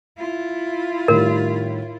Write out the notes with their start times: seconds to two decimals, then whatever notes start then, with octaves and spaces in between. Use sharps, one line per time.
0.18 E4 F4
1.08 A2 D#3 G3 A#4